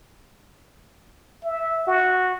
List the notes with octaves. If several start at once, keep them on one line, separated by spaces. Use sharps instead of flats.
E5
F#4